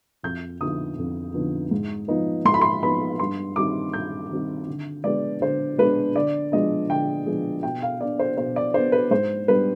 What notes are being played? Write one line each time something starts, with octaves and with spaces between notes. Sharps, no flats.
F2 G6
D3 F3 B3 D#4 D#6
F2
D3 F3 B3 D#4
G#2
F3 B3 D#4
G#2 C6
B5
C6
F3 B3 D#4 B5
G2 C6
D#3 G3 C4 D#4 D6
G2 G6
D#3 G3 C4 D#4
D3
G#3 B3 D4 D5
D3 C5
G#3 B3 D4 B4
D3 D5
F3 G#3 B3 D4 D#5
D3 G5
F3 G#3 B3 D4 G#4
B2 G5
F5
B3 D4 D5
C5
B2 C5
D5
B3 D4 C5
B4
G#2 C5
G3 B3 D4 B4